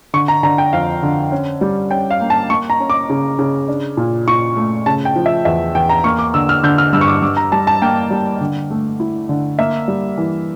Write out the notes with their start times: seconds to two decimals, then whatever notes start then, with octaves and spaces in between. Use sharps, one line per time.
0.14 D3 C#6
0.28 A#5
0.43 D3 A#5
0.58 G5
0.73 F2 F5
1.03 D3
1.32 C#4
1.61 G3
1.91 C#4 G5
2.11 F5
2.21 A#3
2.30 A5
2.50 A#3 C#6
2.70 A#5
2.80 C#4
2.90 D6
3.09 C#3
3.39 C#3
3.68 D4
3.97 A#2
4.27 A#2 C#6
4.56 A3
4.86 C#3 A5
5.05 G5
5.16 F3
5.26 E5
5.45 E2 E5
5.75 E2 G5
5.89 A#5
6.04 A#3 C#6
6.19 D6
6.34 D3 E6
6.49 F6
6.63 D3 G6
6.78 F6
6.93 G2 E6
7.01 C#6
7.08 D6
7.22 G2 D6
7.37 A#5
7.52 G3 A5
7.67 A5
7.82 A#3 G5
8.11 G3
8.41 D3
8.70 A3
9.00 E4
9.29 D3
9.59 A#3 E5
9.88 G3
10.18 E3